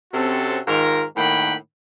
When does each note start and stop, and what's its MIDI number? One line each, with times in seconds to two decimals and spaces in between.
0.13 0.59 48
0.13 0.59 60
0.13 0.59 61
0.13 0.59 66
0.13 0.59 69
0.67 1.05 44
0.67 1.05 51
0.67 1.05 65
0.67 1.05 70
1.16 1.55 45
1.16 1.55 51
1.16 1.55 58
1.16 1.55 78
1.16 1.55 79
1.16 1.55 83